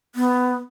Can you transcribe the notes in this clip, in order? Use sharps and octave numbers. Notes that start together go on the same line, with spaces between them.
B3